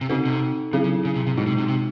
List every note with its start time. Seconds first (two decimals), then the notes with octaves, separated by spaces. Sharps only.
0.01 C3
0.09 C#3 C4 D#4 F#4 A4
0.25 C3
0.73 C#3 F#3 C4 E4 G#4
0.84 C#3
1.05 C#3
1.16 C3
1.27 C3
1.37 A2 G#3 D#4 F#4
1.47 C3
1.58 C3
1.68 C3